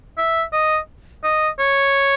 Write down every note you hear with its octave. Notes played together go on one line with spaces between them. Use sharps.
E5
D#5
D#5
C#5